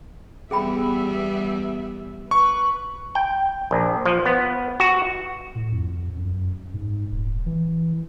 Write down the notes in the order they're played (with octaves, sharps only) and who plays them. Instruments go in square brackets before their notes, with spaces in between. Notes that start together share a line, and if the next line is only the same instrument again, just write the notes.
[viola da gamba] E2 G3 [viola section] B3 E5 [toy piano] G#4 G5 B5
[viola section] B4 [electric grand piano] C#6
[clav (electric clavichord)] G5
A#1
F3
B3
F#4
[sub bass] A2
F2
F#2
G#2
D#1
E3